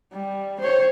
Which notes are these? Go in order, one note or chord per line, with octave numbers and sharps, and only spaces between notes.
G3
C5 C#5